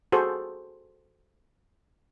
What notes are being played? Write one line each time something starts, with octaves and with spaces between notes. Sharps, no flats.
F#4 G#4 A4 C5